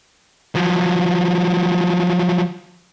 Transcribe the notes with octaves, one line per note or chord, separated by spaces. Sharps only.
F3 F#3